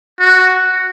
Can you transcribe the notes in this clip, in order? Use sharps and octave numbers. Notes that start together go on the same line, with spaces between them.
F#4